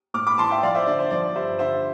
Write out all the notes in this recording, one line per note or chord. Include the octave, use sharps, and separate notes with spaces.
A2 D6 F6
B5 D6
E3 A5 C6
E5 G5
F3 D5 F5
C5 E5
D3 D5
C5
F3 D5
G2 C5 E5
D3 C5 E5